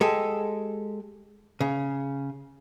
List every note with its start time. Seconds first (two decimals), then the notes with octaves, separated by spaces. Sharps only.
0.01 G#3 G4 A4
1.61 C#3